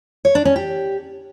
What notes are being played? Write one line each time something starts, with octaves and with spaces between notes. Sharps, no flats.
C#5
D4
C#4
G4